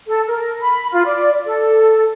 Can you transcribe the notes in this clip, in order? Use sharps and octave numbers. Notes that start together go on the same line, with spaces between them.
A4
A#4
B5
F4
D5
A4